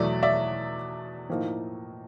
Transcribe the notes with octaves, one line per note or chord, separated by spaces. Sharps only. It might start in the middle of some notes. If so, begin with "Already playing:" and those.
Already playing: E2 B2 F#3 A3 D5 E5
D5 E5
A2 F3 A#3 D#4